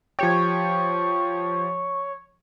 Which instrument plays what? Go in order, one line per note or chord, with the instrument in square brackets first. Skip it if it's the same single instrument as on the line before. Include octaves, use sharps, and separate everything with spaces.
[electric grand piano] F3 G4 G5 [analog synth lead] C#5